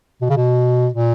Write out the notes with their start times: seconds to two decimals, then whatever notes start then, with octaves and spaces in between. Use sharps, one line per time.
0.21 B2
0.30 C#3
0.37 B2
0.94 A#2